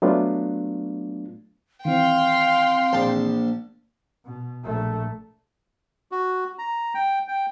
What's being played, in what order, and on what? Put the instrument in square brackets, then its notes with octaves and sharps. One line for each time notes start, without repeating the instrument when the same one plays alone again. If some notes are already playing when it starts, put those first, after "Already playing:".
[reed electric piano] F#3 A3 B3 D4 F4
[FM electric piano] D#3 E3 C4 [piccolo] F5 [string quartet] G5 C6
[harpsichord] A#1 A5
[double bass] B2
A#1 A3
[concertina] F#4
A#5
G5
G5